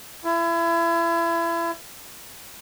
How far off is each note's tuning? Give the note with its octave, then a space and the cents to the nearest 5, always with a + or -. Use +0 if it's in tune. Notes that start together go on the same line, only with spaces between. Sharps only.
E4 +30